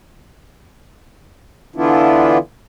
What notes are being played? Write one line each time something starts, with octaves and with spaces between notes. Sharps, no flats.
D3 E3 B3 D4 E4 F4